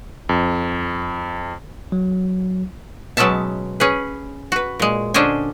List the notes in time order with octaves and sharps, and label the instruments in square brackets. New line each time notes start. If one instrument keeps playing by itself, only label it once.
[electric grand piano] F2
[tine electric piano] F#3
[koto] B2 F#3 G#3 C#4 E5 A5
C#4 G#4 B4
F#4 B4
A#2 G#3
D3 C#4 D4 C5 D#5 G#5